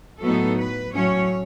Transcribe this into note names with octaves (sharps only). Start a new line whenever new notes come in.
A2 F#3 B3 D#4 A4
B4
A2 F#3 C#4 C#5